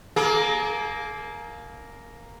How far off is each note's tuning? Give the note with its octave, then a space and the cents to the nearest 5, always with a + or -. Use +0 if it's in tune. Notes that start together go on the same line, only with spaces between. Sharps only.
A#3 +0 G#4 +40